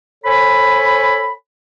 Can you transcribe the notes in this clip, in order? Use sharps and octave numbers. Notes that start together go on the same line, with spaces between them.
A4 C5 C#5 G#5 B5